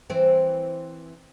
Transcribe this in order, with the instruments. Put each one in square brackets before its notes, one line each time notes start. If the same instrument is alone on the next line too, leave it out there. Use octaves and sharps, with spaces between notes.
[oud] E3 C4